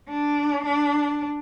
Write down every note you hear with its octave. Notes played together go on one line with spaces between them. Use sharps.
D4
D4